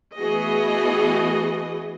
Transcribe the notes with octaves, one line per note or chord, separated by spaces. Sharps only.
E3 A3 B3 F#4 G#4 D#5